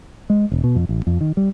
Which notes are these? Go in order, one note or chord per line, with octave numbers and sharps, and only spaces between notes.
G#3
E1
B2
F2
A1
F2
D#3
G3